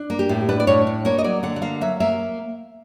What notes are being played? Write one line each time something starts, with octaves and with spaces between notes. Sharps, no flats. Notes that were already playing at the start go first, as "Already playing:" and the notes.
Already playing: D4
A#3
G4
A2
D4 B4
D5
A2 C#5
D4
A#3 C#5
D#5
F#3 D5
D3 F#5
F#5
A#3 F5
F#3 E5
A#3 E5